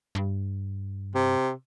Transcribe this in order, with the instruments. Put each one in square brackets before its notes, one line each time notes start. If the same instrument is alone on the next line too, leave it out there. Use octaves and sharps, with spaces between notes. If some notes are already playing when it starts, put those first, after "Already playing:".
[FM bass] G2
[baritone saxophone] C3